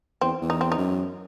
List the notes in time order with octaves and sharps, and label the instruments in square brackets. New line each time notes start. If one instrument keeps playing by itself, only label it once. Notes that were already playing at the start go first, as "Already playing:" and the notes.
[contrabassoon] E2 [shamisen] C4
[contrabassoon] E2
[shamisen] D#4
C4
D#4
[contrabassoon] F#2